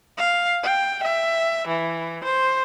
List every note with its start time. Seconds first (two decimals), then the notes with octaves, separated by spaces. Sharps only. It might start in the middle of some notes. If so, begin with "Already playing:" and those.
0.18 F5
0.63 G5
1.03 E5
1.67 E3
2.24 C5